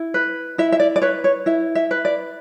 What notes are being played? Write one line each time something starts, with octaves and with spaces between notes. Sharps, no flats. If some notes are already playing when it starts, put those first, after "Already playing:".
Already playing: E4
B4
E4 E5
E5
D5
D5
B4 C#5
C#5
E4 E5
E5
B4
D5